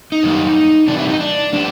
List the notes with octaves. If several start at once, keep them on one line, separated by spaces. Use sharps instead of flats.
D#4
F#2 D#3 G3 A#3
C3 E3 G3 D4
E4
D#4
D4
G3 A#3 D4